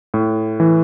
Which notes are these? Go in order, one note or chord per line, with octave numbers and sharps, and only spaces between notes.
A2
E3